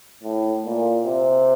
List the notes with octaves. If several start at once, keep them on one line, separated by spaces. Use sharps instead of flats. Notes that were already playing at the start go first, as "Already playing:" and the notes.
A2
A#2
C3